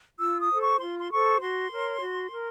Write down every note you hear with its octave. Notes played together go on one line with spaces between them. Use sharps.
F4 E6
D#6
A4 C5
C#6
F4 C6
C6
A4 C5 C#6
F#4 C6
A#4 C#5
F#4
A#4